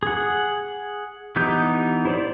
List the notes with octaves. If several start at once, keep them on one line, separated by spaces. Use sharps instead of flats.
G#4 F#5
E3 B3 D#4 G4 G6
E4 C5 D5